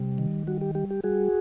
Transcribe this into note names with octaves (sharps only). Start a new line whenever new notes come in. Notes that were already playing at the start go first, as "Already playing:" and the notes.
Already playing: C3 G3
D#3
G3 F#4
G4
G3 G4
G4
G3 F#4 G#4